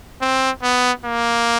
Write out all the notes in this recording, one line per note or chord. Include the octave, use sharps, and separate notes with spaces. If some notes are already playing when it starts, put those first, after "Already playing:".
C4
B3
A#3